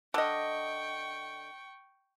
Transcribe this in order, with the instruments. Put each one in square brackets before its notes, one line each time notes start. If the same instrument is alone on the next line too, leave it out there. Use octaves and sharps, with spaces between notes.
[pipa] D3 D#5 [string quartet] G5 C#6